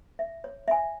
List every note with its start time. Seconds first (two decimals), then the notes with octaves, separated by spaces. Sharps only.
0.19 E5
0.44 C#5
0.68 E5 G#5